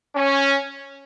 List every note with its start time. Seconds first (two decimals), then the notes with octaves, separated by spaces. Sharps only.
0.16 C#4